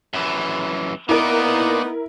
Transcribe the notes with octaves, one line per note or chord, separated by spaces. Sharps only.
F#2 E3
A#3 B3 D#4 E4 A#4 D5